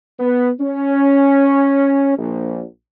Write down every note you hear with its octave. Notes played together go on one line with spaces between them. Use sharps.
B3
C#4
A#1